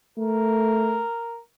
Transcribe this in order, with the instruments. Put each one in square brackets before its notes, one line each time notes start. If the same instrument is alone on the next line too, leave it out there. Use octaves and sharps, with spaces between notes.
[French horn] A3 [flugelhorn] A#4